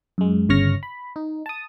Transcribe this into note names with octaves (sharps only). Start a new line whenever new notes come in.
F#2 G#3
G1 C#3 C#5 C#6 F6 A#6
B5
D#4
A5 D#6